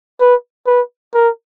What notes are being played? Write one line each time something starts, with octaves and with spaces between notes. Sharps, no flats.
B4
B4
A#4